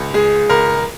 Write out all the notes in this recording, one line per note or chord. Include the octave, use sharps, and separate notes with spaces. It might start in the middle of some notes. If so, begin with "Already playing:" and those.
Already playing: C#2
G#3 G#4
C#2 A#4